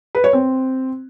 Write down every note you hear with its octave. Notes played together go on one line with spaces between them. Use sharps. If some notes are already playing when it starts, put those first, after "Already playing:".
B4
C#5
C4